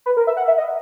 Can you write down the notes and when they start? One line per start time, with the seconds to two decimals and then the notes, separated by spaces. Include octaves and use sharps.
0.06 B4
0.17 A#4
0.27 E5
0.37 F#5
0.48 E5
0.58 D#5